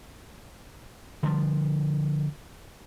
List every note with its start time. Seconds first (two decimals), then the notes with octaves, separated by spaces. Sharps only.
1.23 D3 F3 G3